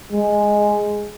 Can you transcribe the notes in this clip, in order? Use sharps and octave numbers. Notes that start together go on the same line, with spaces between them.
G#3